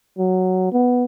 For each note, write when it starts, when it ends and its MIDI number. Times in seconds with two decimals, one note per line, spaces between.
0.18 0.71 54
0.72 1.04 59